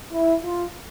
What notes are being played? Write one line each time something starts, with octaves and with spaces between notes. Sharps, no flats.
E4
F4